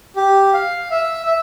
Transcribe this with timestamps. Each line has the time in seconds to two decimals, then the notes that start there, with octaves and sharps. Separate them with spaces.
0.16 G4
0.54 F5
0.91 E5
1.26 E5